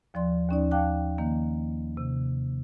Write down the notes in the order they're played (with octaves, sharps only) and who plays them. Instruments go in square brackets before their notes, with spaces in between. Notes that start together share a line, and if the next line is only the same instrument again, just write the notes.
[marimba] D#2 F3 D5 C6
D#2 C#4 D#4 D5
F5 G5 A5 D6 F#6
D#3 A#3
C3